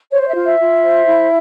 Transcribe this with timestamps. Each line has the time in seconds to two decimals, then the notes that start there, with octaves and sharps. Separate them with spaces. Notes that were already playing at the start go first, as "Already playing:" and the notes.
0.11 C5 C#5
0.21 C#5
0.28 E5
0.35 F4
0.43 E5
0.59 F4
0.83 C5
1.07 E4